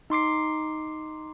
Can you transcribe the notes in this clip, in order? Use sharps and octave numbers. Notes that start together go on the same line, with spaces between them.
D#4 C6 D6 C7